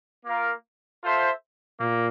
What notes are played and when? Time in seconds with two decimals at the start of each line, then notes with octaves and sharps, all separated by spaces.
0.25 A#3 F4 A#4 F5
1.02 F4 A4 C5 E5
1.79 A#2 A#3